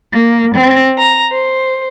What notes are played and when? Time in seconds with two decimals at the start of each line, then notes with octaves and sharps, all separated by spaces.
0.13 A#3
0.54 C4
0.98 A#5
1.31 C5